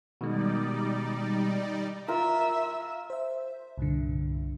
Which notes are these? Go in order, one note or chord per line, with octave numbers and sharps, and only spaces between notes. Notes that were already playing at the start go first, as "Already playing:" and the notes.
B2 D#3 G3 G#3 D#4 D5
F4 A#4 E5
C5 E5
C2 G2 A#2 D3